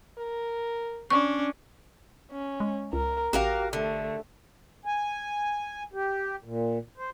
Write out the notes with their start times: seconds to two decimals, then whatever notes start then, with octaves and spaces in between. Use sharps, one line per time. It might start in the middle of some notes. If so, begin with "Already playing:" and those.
0.18 A#4
1.10 C#4 D4 C#6
2.31 C#4
2.60 G#3
2.93 C#2 A#4
3.33 A1 F#4 G4 A#4 F5
3.73 D3 A3
4.85 G#5
5.93 G4
6.44 A#2
6.97 C5